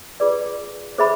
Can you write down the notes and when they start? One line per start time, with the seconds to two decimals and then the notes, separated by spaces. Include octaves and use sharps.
0.20 F4 G#4 B4 D5
0.98 G#4 C5 E5 B5